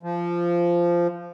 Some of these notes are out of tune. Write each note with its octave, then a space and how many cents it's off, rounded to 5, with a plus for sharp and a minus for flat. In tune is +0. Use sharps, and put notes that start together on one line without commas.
F3 -15